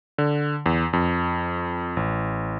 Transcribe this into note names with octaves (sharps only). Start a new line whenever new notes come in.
D3
E2
F2
A1